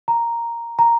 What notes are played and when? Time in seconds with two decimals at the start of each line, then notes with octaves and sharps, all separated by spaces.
0.08 A#5
0.79 A#5